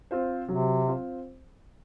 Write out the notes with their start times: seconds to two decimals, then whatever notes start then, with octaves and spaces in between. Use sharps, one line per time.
0.11 C4 F4 C5
0.48 C3 F#3
0.88 C4 F4 C5